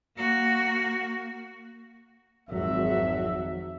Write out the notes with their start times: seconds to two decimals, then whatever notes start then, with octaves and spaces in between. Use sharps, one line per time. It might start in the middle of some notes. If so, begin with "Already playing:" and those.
0.16 A#3 F#4
2.50 G#1 F2 F#3 E5